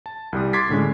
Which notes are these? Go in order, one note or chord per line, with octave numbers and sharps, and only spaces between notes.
A5
C2 G3 D#6
C6 D6 G#6 A6 B6 C7
A2 D3 G#3 C#4